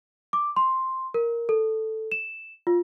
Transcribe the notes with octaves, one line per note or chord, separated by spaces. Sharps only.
D6
C6
A#4
A4
E7
F4